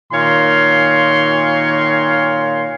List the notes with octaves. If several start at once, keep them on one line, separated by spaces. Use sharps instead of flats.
A#2 D#3 C#5 F5 C6